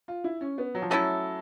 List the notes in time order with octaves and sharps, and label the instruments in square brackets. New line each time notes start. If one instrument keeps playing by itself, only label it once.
[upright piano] F4
E4
C#4
B3
F#3
F3
[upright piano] F#3 [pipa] A3 C#4 E4 A4